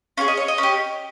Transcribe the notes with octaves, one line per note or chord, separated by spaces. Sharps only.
C#4 F4 G#4 F5
D#5
C#5
D#5
C#4
G4